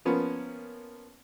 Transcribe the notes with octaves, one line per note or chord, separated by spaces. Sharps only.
F3 A#3 B3 C#4